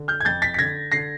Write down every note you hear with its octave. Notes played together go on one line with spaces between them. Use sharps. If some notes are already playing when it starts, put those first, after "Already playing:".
Already playing: D3
F6 G6
G#6
F2 G6 A6
A6 B6
B6
D3 G#6 A#6
D3 A#6 C7